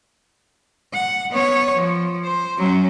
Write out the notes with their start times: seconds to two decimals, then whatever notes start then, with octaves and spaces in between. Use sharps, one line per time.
0.93 F#5
1.31 B3 C#5
1.77 F3
2.25 C5
2.58 F#3 C#4